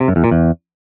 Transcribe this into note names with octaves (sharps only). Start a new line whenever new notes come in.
C3
F#2
E2
A#2
E2